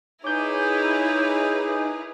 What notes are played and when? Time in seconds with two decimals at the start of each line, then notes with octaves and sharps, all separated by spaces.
0.24 D#4 E4 G#4 A#4 B4 C#5 D6 G6